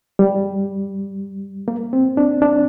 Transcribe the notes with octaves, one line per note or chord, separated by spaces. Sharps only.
G3
A#3
C4
D4
D4